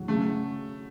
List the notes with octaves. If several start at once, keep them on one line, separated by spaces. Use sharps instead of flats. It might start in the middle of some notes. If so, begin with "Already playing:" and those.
Already playing: F#3
C#3 A3